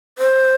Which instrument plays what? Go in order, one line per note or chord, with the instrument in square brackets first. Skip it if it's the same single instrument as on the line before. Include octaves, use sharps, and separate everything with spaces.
[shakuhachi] C5